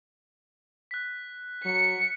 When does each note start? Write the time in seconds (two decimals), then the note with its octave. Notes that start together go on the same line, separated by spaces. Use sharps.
0.91 F#6 B6
1.65 F#3 C#7